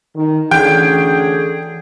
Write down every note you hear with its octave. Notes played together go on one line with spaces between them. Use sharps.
D#3
D2 D3 E3 C#4 G#4 G5